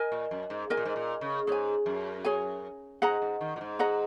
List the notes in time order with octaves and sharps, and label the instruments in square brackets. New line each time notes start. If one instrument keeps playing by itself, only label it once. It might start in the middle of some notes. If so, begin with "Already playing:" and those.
Already playing: [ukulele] A#4 D#5 G#5
[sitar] A#2
F#2
G#2
[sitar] G#2 [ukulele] A#4 D#5 G#5
[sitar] A#2
G#2
A#2
C#3
[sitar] G#2 [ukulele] G#4 C#5 G#5
[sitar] F#2
[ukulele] G#4 C#5 G#5
[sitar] G#2 [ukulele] G#4 D#5 F#5 A#5
[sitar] G#2
D#3
A#2
G#2
[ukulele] G#4 D#5 F#5 A#5